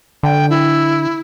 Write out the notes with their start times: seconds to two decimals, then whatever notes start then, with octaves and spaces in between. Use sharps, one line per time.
0.23 D3 G5
0.50 E4